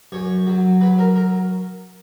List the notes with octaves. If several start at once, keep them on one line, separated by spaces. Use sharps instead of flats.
F#2 C#5
F#3
F#3 B4
A#4
A#4